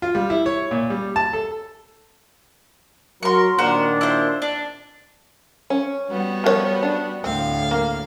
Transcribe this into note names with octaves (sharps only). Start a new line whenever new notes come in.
F4
G3
E4
C#5
A#2
G3
A5
A4
F#3 A#4 C6 C#6
A#2 D#3 D4 F#4 A#4 C5
E4 C5
D4
C#4
G3 B3 F#4
F3 G#4 C#5
D4
D2 A2 C4 F5
A#3